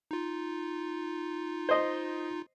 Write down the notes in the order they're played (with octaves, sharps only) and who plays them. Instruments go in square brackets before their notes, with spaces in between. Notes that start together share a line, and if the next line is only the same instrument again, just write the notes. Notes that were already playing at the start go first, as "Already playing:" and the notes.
[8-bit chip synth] D#4 F4
[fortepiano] C5 D#5